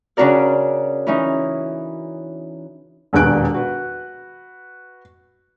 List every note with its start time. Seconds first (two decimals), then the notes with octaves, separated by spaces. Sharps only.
0.17 C#3 C#4 D4 F#4 A#4 D5
1.07 E3 C#4 D#4
3.13 E1 A#1 D#2 B3 F#6 D7
3.54 F#4 B4